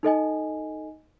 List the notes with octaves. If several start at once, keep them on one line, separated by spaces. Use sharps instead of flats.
D#4 A4 D#5 G#5